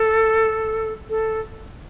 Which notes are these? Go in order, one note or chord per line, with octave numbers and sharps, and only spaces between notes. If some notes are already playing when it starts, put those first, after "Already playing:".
Already playing: A4
A4